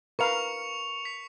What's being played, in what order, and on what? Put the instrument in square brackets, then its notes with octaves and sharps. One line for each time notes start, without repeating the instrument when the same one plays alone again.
[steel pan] A#4 B4 F5 [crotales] C#6 C#7 F7
[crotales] B6